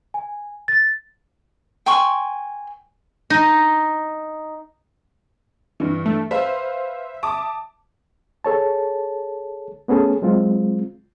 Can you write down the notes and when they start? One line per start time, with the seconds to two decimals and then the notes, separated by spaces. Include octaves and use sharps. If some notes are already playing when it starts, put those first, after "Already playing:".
0.14 G#5
0.68 A6
1.86 G5 G#5 C6 C#6
3.30 D#4
5.80 G2 E3
6.06 A3
6.31 B4 C5 E5 F5
7.23 A5 D6 D#6
8.44 G#4 A4 C#5 A5
9.88 A3 B3 C#4 G#4 A4
10.22 F#3 G#3 C4 F4